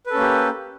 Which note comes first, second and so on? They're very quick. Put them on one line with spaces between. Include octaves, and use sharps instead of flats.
B4 A4 C#4 A#3 G4